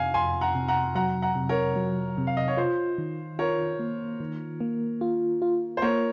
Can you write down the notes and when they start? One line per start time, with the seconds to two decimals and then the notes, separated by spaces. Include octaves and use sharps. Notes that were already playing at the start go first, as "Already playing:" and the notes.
Already playing: F2 C3 F5 G#5
0.14 F2 G#5 C6
0.41 F#5 A#5
0.55 C3
0.68 F#5 A#5
0.95 F#3 F#5 A#5
1.22 F#5 A#5
1.35 C3
1.49 A#4 C#5
1.76 F#3
2.18 C3
2.27 F5
2.37 D#5
2.48 C#5
2.57 F4 C5
2.98 D#3
3.39 F4 A#4 C#5
3.79 A#3
4.20 D#3
4.61 A#3
5.01 F4
5.42 F4
5.77 C5
5.82 A#3 A#4 C#5